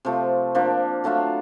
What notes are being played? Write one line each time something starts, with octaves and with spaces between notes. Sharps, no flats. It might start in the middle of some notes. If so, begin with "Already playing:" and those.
C3 F3 A3
F3 A#3 D4
F#3 A3 D4 F4